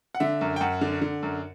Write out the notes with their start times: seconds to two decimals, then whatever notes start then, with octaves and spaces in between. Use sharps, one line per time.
0.15 F#5
0.20 D3 E5
0.41 F#2
0.56 G5
0.61 F#2 F#5
0.81 D3
1.02 D3
1.23 F#2